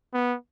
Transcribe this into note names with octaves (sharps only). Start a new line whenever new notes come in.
B3